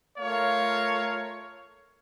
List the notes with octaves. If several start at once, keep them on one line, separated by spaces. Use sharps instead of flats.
A3 F4 A#4 C#5 F5